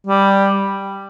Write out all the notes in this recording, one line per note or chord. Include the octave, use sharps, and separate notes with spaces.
G3